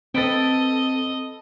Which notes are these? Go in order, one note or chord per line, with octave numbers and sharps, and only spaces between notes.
C4 A4 B4 D#5 G5